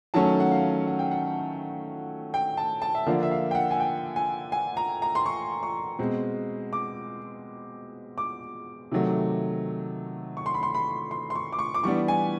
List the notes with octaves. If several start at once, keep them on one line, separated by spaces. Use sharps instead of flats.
D#3 F#3 A3 C#4 A5
F#5
F5
F#5
G5
F#5
G5
A5
A5
E5
D3 F3 A#3 D4 F5
E5
F5
G5
F#5
G#5
G5
G#5
G#5
A#5
A#5
C6
C#6
C#6
B2 G#3 C4
D6
D6
C3 D#3 F#3 A3
C#6
C6
B5
C6
B5
C6
C6
C#6
D6
C#6
D6
E3 G3 B3 D4 C#6
G#5